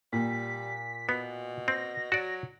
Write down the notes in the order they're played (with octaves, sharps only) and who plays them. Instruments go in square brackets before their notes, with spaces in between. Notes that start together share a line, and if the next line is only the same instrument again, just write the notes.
[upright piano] A#2 [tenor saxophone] G3 [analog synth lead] B6
[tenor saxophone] B2 [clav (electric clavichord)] B3
[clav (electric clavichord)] C4 [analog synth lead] A#6
[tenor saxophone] F#3 [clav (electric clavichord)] F#4 D5